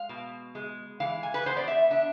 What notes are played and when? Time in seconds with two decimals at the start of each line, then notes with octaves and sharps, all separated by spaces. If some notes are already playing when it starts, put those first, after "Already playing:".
Already playing: G#3 F5
0.09 B2
0.55 G#3
1.00 E3 F5
1.23 G#5
1.34 B4
1.46 B3 C5
1.57 D5
1.68 E5
1.90 D4 E5